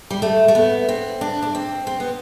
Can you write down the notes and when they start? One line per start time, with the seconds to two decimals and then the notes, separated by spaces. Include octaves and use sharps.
0.10 G3
0.22 A3
0.48 A3
0.55 B3
0.89 C4
1.21 D4
1.42 D4
1.55 C4
1.87 C4
2.00 B3